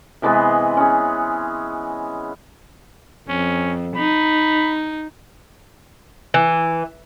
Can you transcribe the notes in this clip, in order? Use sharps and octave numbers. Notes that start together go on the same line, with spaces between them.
C3 E3 G#3 B3
C#4 G#4
F2 C#4
D#4 B5
E3